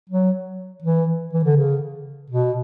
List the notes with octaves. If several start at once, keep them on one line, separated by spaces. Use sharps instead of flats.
F#3
E3
E3
D3
C#3
B2